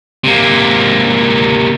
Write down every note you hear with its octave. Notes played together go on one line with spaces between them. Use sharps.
C3 A#3